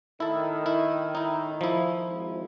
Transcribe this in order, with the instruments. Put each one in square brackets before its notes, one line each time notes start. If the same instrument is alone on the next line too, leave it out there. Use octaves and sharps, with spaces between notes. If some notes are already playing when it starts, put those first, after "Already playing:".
[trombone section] A2 D#3 [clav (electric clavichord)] E4 A4
[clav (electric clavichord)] E4
D#4 E4
F3 E4
[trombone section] G#1